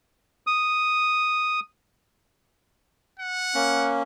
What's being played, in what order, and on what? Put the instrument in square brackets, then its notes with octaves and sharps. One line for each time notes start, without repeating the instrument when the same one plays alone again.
[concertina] D#6
[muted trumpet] F#5
[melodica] A#3 C#4